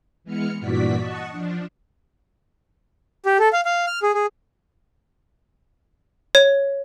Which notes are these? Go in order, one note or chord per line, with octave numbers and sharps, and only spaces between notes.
E3 G#3 B3 F6 C#7
G2 A#2 E3 F#4 D5 B6
D#5 F#5 A5 C#6
F3 D4
G4
A4
F5
F5
F6
G#4
G#4
C#5